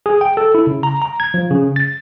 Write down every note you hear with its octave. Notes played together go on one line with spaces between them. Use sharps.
G#4
G5
A4
E4
C#3
A#5
A#5
G#6
F3
C#3
A6